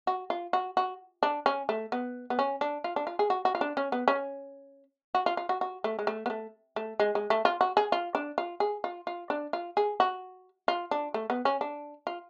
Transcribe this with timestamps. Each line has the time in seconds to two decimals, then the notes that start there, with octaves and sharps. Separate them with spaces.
0.07 F#4
0.30 F4
0.53 F#4
0.77 F#4
1.23 D4
1.46 C#4
1.69 A3
1.92 B3
2.30 B3
2.39 C#4
2.61 D4
2.84 F4
2.96 D4
3.07 F4
3.19 G#4
3.30 F#4
3.45 F#4
3.55 F4
3.61 D4
3.77 C#4
3.92 B3
4.08 C#4
5.15 F#4
5.26 F4
5.37 F4
5.49 F#4
5.61 F#4
5.84 A3
5.99 G#3
6.07 A3
6.26 B3
6.30 A3
6.76 A3
7.00 G#3
7.15 G#3
7.30 A3
7.45 F4
7.61 F#4
7.77 G#4
7.92 F4
8.15 D4
8.38 F4
8.60 G#4
8.84 F4
9.07 F4
9.30 D4
9.53 F4
9.77 G#4
10.00 F#4
10.68 F4
10.91 D4
11.14 A3
11.30 B3
11.45 C#4
11.61 D4
12.07 F4